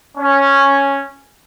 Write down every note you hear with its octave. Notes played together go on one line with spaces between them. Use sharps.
C#4